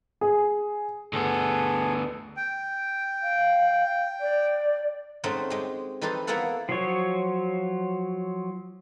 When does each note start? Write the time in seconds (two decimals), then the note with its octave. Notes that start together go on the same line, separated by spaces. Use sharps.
0.21 G#4
1.13 D2 B3 G#4 A4
2.37 G5
3.21 F5
4.20 D5
5.24 G#3 A3 C4 C#4 D#4 F#5
5.50 G#3 G4
6.01 E3 D#4 G4 A4 B4 C5
6.27 A#3 B3 E4 G#4 A4 F#5
6.69 F3 F#3 C#5